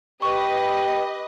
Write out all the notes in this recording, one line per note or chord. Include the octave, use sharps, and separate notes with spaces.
G4 B4 D#5 C#6